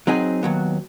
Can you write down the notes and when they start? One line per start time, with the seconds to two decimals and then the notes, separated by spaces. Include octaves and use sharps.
0.07 F#3 C4 D#4 G#4
0.43 D#2 F#3 B3